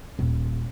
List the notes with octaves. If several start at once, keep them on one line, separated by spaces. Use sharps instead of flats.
D#1